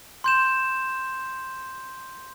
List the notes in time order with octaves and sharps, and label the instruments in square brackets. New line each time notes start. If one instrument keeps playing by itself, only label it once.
[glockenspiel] C6 G6 E7